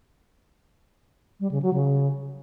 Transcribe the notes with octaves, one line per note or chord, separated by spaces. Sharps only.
G3
C#3
F#3
C#3